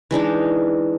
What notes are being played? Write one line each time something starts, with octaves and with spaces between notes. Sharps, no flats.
E3 G#3 D4 D#4